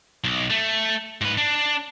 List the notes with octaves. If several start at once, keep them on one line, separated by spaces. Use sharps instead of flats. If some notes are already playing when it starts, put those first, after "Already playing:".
B1
A3
G#2 B4
D4